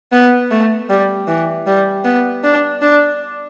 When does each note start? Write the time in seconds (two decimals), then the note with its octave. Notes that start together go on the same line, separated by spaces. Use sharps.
0.12 B3
0.51 A3
0.90 G3
1.28 E3
1.67 G3
2.05 B3
2.44 D4
2.82 D4